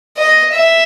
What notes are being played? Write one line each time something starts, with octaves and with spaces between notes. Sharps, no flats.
D#5
E5